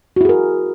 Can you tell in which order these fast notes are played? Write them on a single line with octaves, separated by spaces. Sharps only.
F#4 E4 G#4 A#4